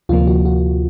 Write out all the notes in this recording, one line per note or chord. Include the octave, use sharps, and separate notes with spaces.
D2 C3 F3 A#3 F4
F#4
F#4